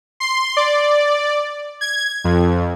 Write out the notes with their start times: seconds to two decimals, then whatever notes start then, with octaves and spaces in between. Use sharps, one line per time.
0.20 C6
0.57 D5
1.81 G#6
2.24 F2